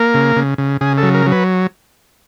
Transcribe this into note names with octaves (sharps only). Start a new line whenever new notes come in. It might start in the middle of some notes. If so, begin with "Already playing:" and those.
Already playing: A#3 A#4
C#3
C#3
C#3
C#3 G#4
A4
F#3
A#4
F#3
B4